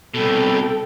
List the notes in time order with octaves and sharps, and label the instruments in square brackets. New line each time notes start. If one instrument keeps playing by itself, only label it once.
[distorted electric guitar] C2 B2 [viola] A4 G5